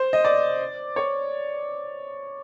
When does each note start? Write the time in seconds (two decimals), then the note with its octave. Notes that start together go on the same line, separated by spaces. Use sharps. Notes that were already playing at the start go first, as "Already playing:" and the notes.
Already playing: C5
0.13 D#5
0.25 D5
0.96 C#5